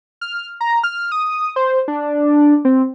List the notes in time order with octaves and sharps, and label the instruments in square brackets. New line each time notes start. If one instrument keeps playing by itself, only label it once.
[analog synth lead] F6
A#5
F6
D#6
C5
D4
C4